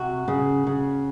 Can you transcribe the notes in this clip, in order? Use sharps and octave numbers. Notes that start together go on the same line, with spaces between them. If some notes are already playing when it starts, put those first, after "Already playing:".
Already playing: C3 F#4
C#3
C#3